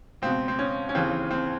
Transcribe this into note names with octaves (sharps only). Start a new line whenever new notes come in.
C#2 B2 C4
C4
C#4
C#4
D#2 C#3 E3 C4
C4